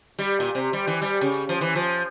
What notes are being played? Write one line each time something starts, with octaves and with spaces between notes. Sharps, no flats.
G3
A#2
C3
G3
E3
G3
C#3
F3
E3
F3